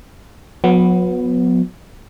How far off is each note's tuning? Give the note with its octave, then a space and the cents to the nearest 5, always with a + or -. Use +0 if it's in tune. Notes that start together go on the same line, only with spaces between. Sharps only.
F#3 -40 B3 +0